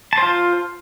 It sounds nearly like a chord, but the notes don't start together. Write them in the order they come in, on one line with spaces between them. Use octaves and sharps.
A5 C5 F4